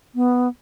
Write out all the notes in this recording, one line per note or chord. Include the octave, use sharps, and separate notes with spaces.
B3